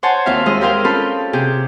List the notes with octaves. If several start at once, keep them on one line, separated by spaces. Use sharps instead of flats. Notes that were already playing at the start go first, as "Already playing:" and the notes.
C5 C#5 F#5 G#5 A5
D#2 C4 F4 E5 F5
G#3 F4 D#5 E6
G4 G#4 A#4 C5 F5 G5
C4 C#4 F4 A4 B5
C3 G4 G#4